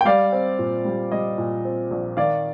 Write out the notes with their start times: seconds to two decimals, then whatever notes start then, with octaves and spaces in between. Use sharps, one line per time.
0.01 G5
0.05 G3 D5 F5
0.32 C4
0.59 A#2
0.85 G3
1.12 G3 D#5
1.38 A#2
1.65 C4
1.91 A#1
2.17 D#3 D5 F5